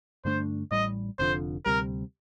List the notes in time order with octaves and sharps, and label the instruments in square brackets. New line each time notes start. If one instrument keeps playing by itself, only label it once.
[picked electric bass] G2 D3 A3 D4 [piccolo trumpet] C5
[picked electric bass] A1 A2 G3 [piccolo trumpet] D#5
[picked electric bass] F1 F2 D3 F3 [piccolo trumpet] C5
[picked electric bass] D2 C3 G3 [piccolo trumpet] A#4